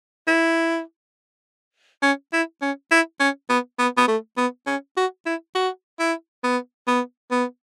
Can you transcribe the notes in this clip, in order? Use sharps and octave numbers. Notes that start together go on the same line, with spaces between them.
E4
C#4
E4
C#4
E4
C#4
B3
B3
B3
A3
B3
C#4
F#4
E4
F#4
E4
B3
B3
B3